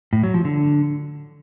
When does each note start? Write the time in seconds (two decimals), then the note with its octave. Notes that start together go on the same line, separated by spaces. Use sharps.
0.13 A2
0.23 F#3
0.34 F3
0.45 D3